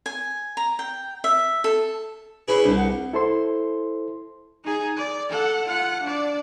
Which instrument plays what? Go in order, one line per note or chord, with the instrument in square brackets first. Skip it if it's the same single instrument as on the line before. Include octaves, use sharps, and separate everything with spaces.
[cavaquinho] G#5
A#5
G5
E5
A4
[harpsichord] C#4 E4 G#4 [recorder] B4
[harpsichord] C2 [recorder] D4
[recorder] F#5
[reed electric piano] E4 A4 C5 C6
[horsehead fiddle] D#4 G#4
D5
A4 F#5
F4 F#5
D4 D5